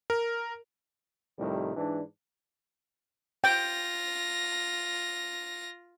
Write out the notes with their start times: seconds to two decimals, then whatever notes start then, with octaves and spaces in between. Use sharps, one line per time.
0.10 A#4
1.38 C2 A2 D#3 F3 G3
1.76 G#2 E3 D4
3.44 F4 G5 A#6